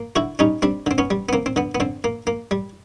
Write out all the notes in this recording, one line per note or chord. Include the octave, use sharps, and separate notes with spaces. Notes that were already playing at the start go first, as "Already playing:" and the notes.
Already playing: A#3
D3 E4 F#4
G3 C#4 D#4
G3 C4 D4
D3 C4
B3 C#4
G3
B3
A#3 C4
C4
D3 B3
B3
D3 C4
A#3
A#3
G3